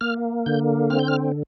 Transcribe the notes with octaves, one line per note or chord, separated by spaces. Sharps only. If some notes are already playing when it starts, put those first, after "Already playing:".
A#3 F6
D3 G6
C4 F6
G6
F6